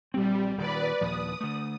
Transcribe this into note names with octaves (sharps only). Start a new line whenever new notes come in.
A#1 G3 C4
D#1 D#3 B4 D5
D#2 A#2 F3 D#6
D3 A3